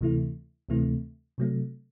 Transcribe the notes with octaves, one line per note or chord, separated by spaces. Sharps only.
D2 C3 E3 A3 E4
D2 C3 E3 A3 E4
C3 F#3 A3